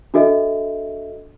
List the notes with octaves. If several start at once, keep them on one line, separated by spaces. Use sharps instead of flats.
D4 F#4 A4 D#5 E5